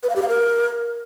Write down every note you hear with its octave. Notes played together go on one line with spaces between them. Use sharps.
B4
F5
G4
F5
A#4